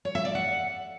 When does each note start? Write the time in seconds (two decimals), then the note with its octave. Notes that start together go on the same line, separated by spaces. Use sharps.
0.05 C#5
0.15 E5
0.25 D5
0.35 F#5